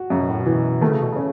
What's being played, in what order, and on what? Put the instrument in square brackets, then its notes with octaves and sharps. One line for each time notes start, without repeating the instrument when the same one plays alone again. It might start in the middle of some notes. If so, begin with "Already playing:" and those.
Already playing: [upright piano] F#4
[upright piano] F#2 [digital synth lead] C#3
[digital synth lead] B2
A2
B2
[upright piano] E3
[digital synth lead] D#3 [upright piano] A3
[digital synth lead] C#3
B2
[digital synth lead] C#3 [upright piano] C#4